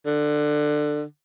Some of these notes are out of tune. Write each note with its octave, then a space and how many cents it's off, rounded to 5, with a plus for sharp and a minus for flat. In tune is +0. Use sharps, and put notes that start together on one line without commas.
D3 +20